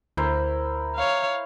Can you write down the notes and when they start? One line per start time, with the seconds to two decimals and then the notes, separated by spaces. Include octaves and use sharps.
0.17 D2 E4 A#4 C5
0.96 C#5 F5